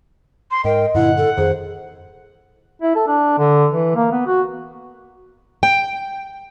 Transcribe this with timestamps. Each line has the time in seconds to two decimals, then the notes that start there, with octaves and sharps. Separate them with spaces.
0.51 C6
0.65 G#2 A#4 D#5 G5
0.94 G2 A#2 D3 E4 F#5
1.17 A4
1.37 F2 D#3 G#4 C5
2.82 E4
2.96 A4
3.07 D4
3.38 D3
3.71 E3
3.96 A#3
4.12 B3
4.27 F#4
5.63 G5